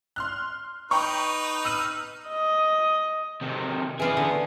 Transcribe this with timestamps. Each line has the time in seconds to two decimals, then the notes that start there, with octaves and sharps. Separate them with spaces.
0.16 C6 F6 F#6
0.91 D#4 B4 G5 A#5 C#6
1.65 E6 F6 D#7
2.28 D#5
3.41 C3 D#3
4.00 E3 B3 F4 G#4 D5
4.17 D3